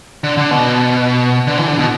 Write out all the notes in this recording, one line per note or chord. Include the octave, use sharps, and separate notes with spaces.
D3
D3
B2
D3
E3
D3
B2